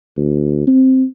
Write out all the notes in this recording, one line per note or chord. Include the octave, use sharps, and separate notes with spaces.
D2
C4